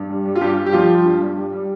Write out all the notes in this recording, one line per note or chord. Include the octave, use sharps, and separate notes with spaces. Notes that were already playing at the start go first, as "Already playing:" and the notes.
Already playing: G2
G3
G3
F4
G2 G3 G4
G2
G4
F3 G3 F4
G3
G2
G2
G3
G3